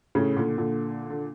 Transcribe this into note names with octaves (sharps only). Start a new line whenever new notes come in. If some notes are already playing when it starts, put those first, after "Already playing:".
A2 C#3
A#2 D3
A#2 D3
D3